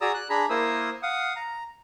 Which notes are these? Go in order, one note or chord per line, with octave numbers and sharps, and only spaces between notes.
F#4 G#4 D5 A#5 D#6 E6
F#6
D4 G#4 A#5 B5
A#3 E4 A#4 C5 D#6 E6
F5 F#5 D#6
A#5